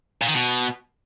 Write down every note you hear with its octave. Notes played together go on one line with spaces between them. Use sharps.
A#2
D#3
B2